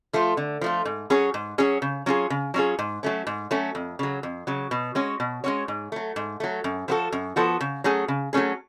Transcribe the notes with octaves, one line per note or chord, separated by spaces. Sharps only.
F3 A3 F4
D3
F3 A3 F4
G#2
F#3 C#4 G#4 C#5
G#2
F#3 C#4 G#4 C#5
C#3
F#3 C#4 F4 G#4
C#3
F#3 C#4 F4 G#4
G#2
F#3 A3 C#4
G#2
F#3 A3 C#4
F2
C#3 F#3
F2
C#3 F#3
B2
G#3 C#4 F#4 C#5
B2
G#3 C#4 F#4 C#5
G#2
F#3 A3
G#2
F#3 A3
F#2
F3 B3 F#4 A4
F#2
F3 B3 F#4 A4
C#3
F#3 A3 C#4 G#4
C#3
F#3 A3 C#4 G#4